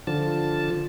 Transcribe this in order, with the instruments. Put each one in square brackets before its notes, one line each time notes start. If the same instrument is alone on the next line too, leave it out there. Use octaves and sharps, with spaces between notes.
[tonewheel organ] D3 F3 A5